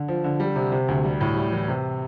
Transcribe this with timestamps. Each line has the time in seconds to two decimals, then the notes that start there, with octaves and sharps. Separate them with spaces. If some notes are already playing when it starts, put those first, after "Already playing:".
Already playing: D3
0.08 F3
0.24 D3
0.40 G3
0.56 C3
0.72 C3
0.88 D2
1.05 G3
1.21 A2
1.36 G3
1.52 E3
1.68 C3